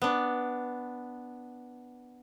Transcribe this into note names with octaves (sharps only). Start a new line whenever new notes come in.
B3 D4